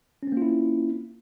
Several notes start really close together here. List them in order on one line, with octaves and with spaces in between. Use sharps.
C#4 C4 A#3 F4 E4